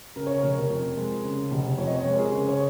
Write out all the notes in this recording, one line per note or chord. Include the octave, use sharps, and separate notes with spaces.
C#3 A#4
C#5
A#4
F1
F2
G#3
C#3
F1
F2 C#5
D#5
C#5
G#3
A#4
G#4
C#3
C#5